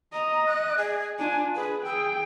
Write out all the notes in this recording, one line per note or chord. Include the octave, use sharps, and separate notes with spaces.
D#5 A#5
F#6
G#4
D4 F4 G#5
G#4 B4
G#4 G5 E6